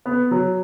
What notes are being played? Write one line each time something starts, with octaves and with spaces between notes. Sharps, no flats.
B3
F#3